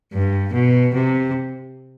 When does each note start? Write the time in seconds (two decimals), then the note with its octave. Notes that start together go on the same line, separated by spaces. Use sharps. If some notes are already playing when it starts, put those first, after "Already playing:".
0.13 G2
0.53 B2
0.94 C3